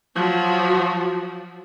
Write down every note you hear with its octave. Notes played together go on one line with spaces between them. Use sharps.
F3 F#3